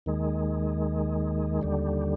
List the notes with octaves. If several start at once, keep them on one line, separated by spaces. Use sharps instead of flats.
D#2 D#3 G#3
D#2 D3 G3